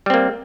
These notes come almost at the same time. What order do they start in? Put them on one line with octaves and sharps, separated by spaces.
G3 C4 A#3